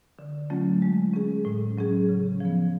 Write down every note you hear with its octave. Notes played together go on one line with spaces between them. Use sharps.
D3
F#3 A3 C#4 F4
G#3
C#4 G#4
A2
F#3 C#4 G#4
C#3
F3 B3